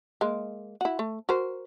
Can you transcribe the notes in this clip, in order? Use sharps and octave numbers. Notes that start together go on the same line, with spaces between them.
G#3 A#3
E4 F#4
A3
F#4 A#4 C5